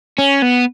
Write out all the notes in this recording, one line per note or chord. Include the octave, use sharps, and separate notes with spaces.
C#4
B3